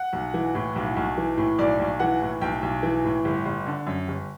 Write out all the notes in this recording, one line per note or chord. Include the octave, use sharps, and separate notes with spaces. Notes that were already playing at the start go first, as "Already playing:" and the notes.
Already playing: F#5
B1
E3
A2
B1
B1
E3
A2
B1 D5
B1
E3 F#5
A2
B1 G5
B1
E3
A2
G1
G1
D3
F#2
G1